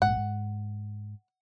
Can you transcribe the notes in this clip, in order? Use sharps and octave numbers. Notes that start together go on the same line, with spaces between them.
A#1 G#2 F#5
G#2